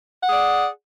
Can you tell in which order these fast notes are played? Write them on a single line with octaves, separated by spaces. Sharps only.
F#5 G#4 D5